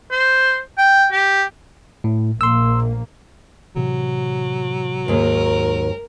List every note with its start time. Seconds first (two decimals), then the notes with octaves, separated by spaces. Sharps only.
0.11 C5
0.78 G5
1.12 G4
2.04 A2
2.41 A#1 A#3 C6 E6
3.76 A2 C3 E3 F#3
5.08 D#2 G#2 A#4